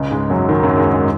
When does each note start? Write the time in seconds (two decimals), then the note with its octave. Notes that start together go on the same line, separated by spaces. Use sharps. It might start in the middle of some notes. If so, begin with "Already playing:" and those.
Already playing: C#2 C#3
0.11 G#2 G#3
0.30 F#2 F#3
0.48 D#2 D#3
0.63 F#2 F#3
0.77 G#2 G#3
0.91 G#2 G#3